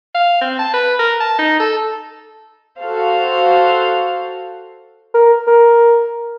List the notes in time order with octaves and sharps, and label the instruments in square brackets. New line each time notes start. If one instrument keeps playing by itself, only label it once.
[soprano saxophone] F5
C4
A5
B4
A#4
A5
D#4
A4
[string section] F#4 A4 C5 F5
[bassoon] A#4
A#4